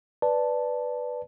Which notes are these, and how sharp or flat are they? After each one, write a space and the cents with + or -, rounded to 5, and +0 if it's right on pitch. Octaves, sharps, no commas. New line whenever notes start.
B4 +0 D5 +0 A5 +0